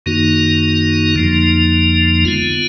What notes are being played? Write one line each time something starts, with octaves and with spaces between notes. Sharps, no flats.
F#2 D#3 A#3 D#4 F#4
F2 D3 F3 A#3 D#4
D3 G#3 B3 F4